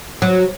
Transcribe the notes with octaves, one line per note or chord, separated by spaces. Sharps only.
F#3